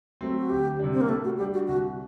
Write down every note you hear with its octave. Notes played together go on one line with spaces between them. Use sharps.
F#3 A3 C4
F#4
D2 G4
C3 G3 D4
C4
A#3
A2 A3
F#4
G3 D4 G4
F#4
C2 F#4